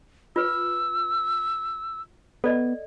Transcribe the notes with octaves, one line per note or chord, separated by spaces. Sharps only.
F4 B4 E6
B3 A4 D5 D#5